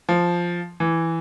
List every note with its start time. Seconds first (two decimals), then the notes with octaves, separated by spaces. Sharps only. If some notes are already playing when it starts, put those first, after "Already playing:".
0.09 F3
0.80 E3